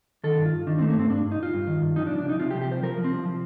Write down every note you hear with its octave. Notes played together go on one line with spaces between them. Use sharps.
D#3 A4
G2
F4
G2
D#3 D4
C4
A3
A#3
G2 C4
G2 D4
G2
D#4
G2 F4
G2
D#3
G2
F3 D#4
D4
C2
D4
C2 D#4
C3 F4
G4
F3
G4
C2 C5
F3 A#4
F3
C4
C2
F3